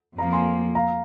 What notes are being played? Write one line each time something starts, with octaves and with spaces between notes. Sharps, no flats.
F2 F3 A#3 F5 A#5
G#5 C6
F5 A#5